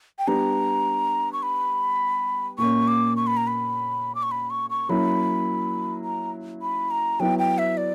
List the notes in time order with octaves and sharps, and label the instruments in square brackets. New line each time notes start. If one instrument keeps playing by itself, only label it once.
[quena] G5
[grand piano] G3 B3 D4 G4 [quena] A#5
[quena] C#6
B5
[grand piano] A#2 A#3 C#4 [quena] C#6
[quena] D6
C#6
B5
A#5
B5
D6
C#6
B5
C#6
C#6
[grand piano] F#3 A#3 C#4 E4 [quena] B5
[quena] A#5
B5
A#5
[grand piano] F#3 B3 E4 [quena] G5
[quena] G5
E5
D5